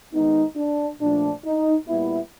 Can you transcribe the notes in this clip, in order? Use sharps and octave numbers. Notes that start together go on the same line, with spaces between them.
D#3 G#3 B3 D#4
D4
A#2 F3 A3 D4
D#4
A#2 G3 B3 E4